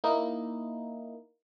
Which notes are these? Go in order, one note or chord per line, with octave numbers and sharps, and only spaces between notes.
A#3 D#4 E4